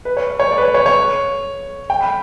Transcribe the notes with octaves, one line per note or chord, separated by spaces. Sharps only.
B4
C#5
C#5
D5
B4
C#5
C#5
C#5
G5
B5